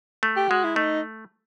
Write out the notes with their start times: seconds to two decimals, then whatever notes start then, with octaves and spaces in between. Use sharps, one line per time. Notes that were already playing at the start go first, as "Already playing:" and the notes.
0.23 A3
0.37 G4
0.50 G#3 F#4
0.64 E4
0.76 A3 D#4